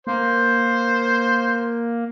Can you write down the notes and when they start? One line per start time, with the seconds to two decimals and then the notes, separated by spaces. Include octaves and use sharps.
0.07 A#3 C5